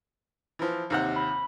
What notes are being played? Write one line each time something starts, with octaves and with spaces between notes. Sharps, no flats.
E3 F3
D#2 C3 F#5
B5